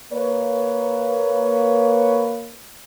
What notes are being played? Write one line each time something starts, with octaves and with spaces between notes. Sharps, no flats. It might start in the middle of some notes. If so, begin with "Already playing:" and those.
A#3 B4 C#5